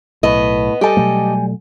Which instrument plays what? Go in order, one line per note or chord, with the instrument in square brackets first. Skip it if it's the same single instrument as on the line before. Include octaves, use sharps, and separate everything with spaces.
[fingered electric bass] B1 [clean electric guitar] A2 [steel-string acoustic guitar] B3 D#5
[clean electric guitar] G3 G#5 [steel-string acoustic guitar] G4 A4 D#5
[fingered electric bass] B2 F#3 A3